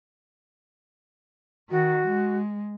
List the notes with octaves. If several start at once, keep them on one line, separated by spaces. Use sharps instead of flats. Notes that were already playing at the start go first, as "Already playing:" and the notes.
D#3 F#4
G#3